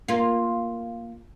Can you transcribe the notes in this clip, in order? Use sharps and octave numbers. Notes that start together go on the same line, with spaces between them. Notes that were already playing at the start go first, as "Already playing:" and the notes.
A#3 F4